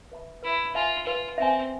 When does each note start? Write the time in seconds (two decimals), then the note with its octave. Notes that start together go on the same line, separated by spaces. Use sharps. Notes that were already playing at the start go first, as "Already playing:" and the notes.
0.12 B4 E5 B5
0.43 E4 B4
0.75 F4 E5 G#5
1.06 F4 B4
1.38 C4 E5 G#5